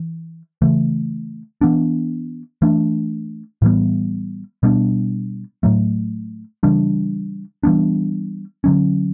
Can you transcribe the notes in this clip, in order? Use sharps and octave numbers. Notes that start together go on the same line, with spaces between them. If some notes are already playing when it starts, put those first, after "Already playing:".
Already playing: E3
C#3 E3 A3
E3 B3 D4
E3 A3 D4
A2 E3 G3 B3
B2 G3 B3 D4
A2 F#3 A3
C#3 E3 G3 D4
E3 G3 B3 D4
D3 F#3 C#4